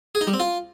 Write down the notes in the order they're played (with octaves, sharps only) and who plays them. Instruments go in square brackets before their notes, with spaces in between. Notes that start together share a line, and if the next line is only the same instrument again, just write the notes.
[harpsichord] G#4
D#4
G3
C4
F4